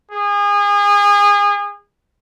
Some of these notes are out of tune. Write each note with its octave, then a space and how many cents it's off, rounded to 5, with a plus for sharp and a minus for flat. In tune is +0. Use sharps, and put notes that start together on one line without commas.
G#4 -30